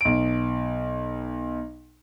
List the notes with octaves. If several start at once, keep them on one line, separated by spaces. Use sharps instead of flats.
B1 D7